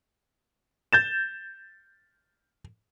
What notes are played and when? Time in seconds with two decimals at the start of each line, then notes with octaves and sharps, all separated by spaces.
0.93 G6 A6 E7